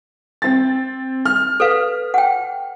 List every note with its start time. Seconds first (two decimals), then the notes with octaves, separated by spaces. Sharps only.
0.42 C4 A6
1.25 F6
1.60 A4 B4 F5
2.14 F#5 G5